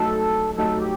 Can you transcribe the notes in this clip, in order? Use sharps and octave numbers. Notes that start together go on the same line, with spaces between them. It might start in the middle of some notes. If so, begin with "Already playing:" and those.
Already playing: F#3 A3 D#4 F#4 A4
F#3 A3 D#4 F#4 A4
G4